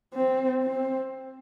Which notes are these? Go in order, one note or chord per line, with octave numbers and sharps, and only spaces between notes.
C4
C4